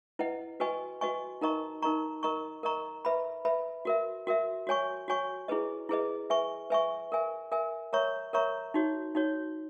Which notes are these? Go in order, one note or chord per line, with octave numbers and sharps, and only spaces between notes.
E4 B4 D#5 F#5
F#4 B4 D#5 G#5 C#6
F#4 B4 D#5 G#5 C#6
D#4 A#4 D#5 A#5 C#6
D#4 A#4 D#5 A#5 C#6
A#4 D#5 A#5 C#6
A#4 D#5 A#5 C#6
B4 E5 B5
B4 E5 B5
F#4 A#4 E5
F#4 A#4 E5
F#4 C#5 G#5 C#6
F#4 C#5 G#5 C#6
E4 G#4 B4 D#5
E4 G#4 B4 D#5
B4 E5 G#5 C#6
B4 E5 G#5 C#6
A#4 E5 G#5
A#4 E5 G#5
A#4 C#5 E5 A#5 C#6
A#4 C#5 E5 A#5 C#6
D#4 F#4 C#5
D#4 F#4 C#5